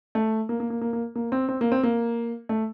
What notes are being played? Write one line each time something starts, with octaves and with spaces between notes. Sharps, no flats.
A3
A#3
A#3
A#3
A#3
A#3
A#3
C4
C4
A#3
C4
A#3
A3